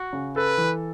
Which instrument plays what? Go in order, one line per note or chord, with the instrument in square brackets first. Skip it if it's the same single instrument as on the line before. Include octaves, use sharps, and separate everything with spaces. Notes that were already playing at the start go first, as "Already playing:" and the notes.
Already playing: [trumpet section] F#4
[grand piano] C#3
[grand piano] A4 [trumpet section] B4
[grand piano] E3